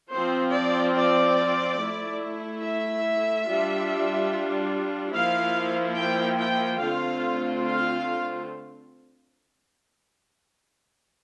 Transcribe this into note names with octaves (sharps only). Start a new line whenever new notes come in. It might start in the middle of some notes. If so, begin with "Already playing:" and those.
F3 C4 F4 C5
D5
D5
A3 E4
E5
G3 D4 F4
F3 A#3 E4 F5
G5
G5
D3 A3 C4 F4 F5
F5